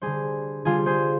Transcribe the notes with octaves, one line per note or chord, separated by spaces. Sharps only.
D3 G3 G#4 C5
D3 G3 F4 G#4
G#4 C5